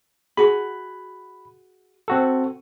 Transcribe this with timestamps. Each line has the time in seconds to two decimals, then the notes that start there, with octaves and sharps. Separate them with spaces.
0.37 F#4 G#4 B5
2.08 C4 F#4 A4